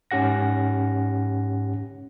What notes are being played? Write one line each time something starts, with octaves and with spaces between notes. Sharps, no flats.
G#2 C#4 G4 F#5 A#6